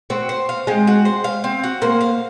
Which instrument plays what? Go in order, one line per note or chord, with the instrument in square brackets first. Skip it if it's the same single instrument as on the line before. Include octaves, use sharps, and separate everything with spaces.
[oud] C4 [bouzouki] F#4
[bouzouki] C5
F5
[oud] G#3 [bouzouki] C4
[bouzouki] F#4
C5
F5
C4
F#4
[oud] A#3 [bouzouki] C5
[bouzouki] F5